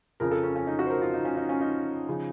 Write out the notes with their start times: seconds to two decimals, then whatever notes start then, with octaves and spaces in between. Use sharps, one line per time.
0.20 F2 C#3 F3 A#4
0.31 A4
0.43 C#4
0.56 C#4
0.67 D#4
0.79 F#4
0.86 C5
0.90 A#4
1.02 F4
1.14 D#4
1.25 C#4
1.37 D#4
1.49 C#4
1.61 D#4
2.09 C#3 F3